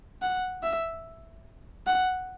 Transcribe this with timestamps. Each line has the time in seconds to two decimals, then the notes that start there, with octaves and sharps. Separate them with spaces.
0.22 F#5
0.63 E5
1.87 F#5